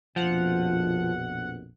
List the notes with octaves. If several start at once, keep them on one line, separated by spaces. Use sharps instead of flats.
A#1 F2 B2 F3 F#5